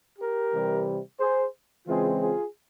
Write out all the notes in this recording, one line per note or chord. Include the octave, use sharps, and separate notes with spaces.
G4 A#4
C3 E3 G3
G#4 C5
C#3 E3 G#3 C4 F4 G#4
F4 G#4